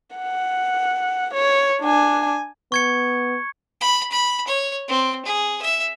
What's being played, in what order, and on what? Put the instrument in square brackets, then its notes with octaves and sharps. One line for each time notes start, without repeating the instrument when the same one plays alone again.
[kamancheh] F#5
C#5
D4 G#5
[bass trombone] B3 [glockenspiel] C#6 G#6 C#7
[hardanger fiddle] B5
B5
C#5
C4
G#4
E5